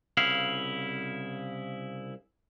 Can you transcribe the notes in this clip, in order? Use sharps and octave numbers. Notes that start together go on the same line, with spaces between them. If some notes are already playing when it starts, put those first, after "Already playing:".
C2 C#3 E4 F5